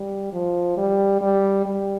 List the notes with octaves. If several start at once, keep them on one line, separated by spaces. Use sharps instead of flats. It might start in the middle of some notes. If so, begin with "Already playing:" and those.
Already playing: G3
F3
G3
G3
G3